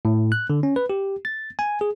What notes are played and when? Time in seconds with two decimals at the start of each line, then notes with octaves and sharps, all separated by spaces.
0.05 A2
0.32 F#6
0.50 D3
0.63 C#4
0.76 B4
0.90 G4
1.25 A6
1.59 G#5
1.81 G#4